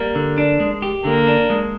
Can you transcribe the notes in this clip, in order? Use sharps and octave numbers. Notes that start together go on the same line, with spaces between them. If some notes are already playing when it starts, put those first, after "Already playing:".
Already playing: G3 A#3
D3
D4
G#3
G4
D3 A#3
D4
G#3